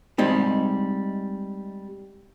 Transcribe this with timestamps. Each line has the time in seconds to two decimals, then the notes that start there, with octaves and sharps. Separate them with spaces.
0.18 G3 G#3 C4 D#4